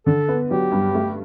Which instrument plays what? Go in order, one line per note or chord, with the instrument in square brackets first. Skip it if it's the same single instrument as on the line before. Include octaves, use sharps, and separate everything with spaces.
[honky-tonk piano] D3 [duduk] A4
[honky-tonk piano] B3
[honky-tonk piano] F#3 [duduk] G4
[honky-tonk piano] G2
A3